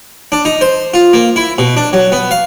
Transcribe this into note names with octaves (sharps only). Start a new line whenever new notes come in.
D4
D#4
C5
F4
A#3
E4
B2
D4
F#3
B3
F5